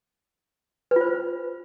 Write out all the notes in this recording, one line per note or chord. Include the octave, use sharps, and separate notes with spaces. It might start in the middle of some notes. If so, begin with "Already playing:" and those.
F4 B4 C5